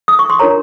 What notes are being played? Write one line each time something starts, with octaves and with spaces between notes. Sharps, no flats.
D#6
C#6
C6
D4 F4 A#4 C#5 A#5